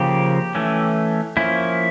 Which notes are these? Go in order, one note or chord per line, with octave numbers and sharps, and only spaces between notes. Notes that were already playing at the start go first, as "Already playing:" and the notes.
Already playing: C#3 F3 A#3 G4
E3 A3 C#4
F3 A#3 C#4 E4